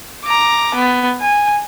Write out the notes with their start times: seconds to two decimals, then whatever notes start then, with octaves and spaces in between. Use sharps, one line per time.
0.24 A#5 D6
0.75 B3
1.21 G#5